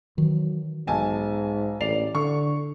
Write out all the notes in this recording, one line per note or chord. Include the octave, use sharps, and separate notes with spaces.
D#3 E3 F#3
B1 G#2 G#5 A5
A1 D5 C7 F7
D3 C#6